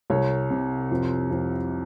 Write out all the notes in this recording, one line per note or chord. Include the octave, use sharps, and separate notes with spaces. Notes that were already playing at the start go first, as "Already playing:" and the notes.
C2 C#5
C3
F2
F2